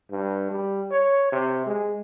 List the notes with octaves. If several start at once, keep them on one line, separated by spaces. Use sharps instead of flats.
G2
G3
C#5
C3
G#3